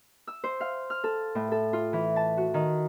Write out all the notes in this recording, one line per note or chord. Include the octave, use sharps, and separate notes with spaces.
E6
C5
F5
F6
A4
A2
A4
F4
E3
A5
F#4
D#3